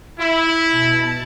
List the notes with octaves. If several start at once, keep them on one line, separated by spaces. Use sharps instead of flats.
E4
B2 A5